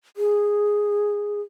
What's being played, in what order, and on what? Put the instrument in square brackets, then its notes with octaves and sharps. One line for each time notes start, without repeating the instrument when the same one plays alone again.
[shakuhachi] G#4